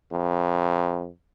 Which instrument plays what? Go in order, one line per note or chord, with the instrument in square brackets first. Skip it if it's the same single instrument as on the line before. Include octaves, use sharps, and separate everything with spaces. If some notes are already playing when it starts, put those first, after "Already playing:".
[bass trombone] F2